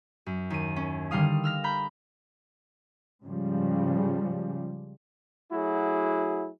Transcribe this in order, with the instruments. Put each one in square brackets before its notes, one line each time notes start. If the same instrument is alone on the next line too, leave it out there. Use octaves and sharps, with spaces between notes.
[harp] F#2
D#2 D#7
C#4
D3 D#3 G3 F5 D#6
E6 F6 A#6
A#5 B5 G6
[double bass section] G#2 C#3 F3 G3
[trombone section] F#3 A3 E4 F#4 G#4